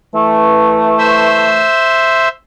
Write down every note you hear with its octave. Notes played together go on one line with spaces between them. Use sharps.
E3 A3
C5 E5